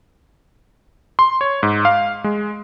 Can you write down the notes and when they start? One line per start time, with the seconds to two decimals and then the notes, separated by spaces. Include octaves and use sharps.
1.19 C6
1.41 C#5
1.63 G#2
1.85 F5
2.24 G#3